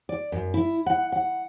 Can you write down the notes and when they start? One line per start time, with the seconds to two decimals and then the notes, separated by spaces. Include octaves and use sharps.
0.09 D5
0.32 F#2
0.54 E4
0.86 F#5
1.12 F#5